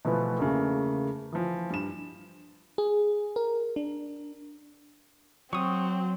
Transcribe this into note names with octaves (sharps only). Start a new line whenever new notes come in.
B2 E3 F3 A3 B3
E2 C#3 A3 A#3
E3 F3
G2 E7
G#4
A#4
D4
F#3 C4 C#6 D#6